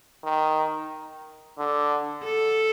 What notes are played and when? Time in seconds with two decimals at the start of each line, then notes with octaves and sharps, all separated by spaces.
0.24 D#3
1.58 D3
2.24 A4